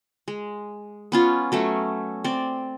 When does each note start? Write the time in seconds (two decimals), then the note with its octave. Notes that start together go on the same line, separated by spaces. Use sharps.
0.28 G#3
1.12 B3 C#4 F4
1.52 F#3 A3 C#4
2.24 C4 D5